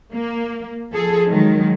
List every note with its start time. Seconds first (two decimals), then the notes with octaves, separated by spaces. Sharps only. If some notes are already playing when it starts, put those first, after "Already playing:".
0.12 A#3
0.91 F3 G#4 A4
1.29 D#3 F#3 G#3